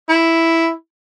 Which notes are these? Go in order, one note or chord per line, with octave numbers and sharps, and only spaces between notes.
E4